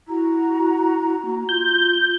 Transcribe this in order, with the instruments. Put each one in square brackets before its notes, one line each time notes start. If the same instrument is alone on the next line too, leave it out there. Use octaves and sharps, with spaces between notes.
[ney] E4 [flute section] F#4 A#5
[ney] A#3
[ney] F4 [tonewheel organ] G6